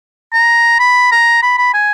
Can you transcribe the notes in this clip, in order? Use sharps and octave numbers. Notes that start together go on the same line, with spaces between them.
A#5
B5
A#5
B5
B5
G#5